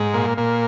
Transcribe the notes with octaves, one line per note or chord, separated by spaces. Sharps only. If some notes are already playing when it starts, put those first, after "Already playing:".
Already playing: G#2
A#2
A#2